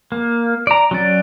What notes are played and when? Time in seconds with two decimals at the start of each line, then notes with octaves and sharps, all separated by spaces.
0.12 A#3
0.67 D5 A#5
0.91 F#3 C#4 D5